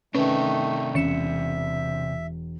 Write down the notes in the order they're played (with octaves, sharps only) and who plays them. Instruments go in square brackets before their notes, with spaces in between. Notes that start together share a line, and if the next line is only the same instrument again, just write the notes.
[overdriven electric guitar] C3 D4 [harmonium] D#3 A3 [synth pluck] C#4 B4
[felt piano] E1 [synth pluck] C#4 C#7 E7 [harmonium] E5